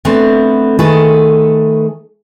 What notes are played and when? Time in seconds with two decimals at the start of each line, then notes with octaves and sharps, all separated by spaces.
0.05 D3 A3 B3 C4
0.79 D#3 A3 G#4 A4 B4